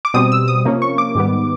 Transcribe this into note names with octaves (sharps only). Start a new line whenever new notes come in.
D6
B2 G3 C4 D#6
E6
D#6
C3 F3 A#3 C#4
C#6
D6
G#2 D#3 G3 B3